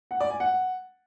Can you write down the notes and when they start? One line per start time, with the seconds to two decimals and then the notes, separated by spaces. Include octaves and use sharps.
0.11 F#5
0.21 D5
0.30 G#5
0.40 F#5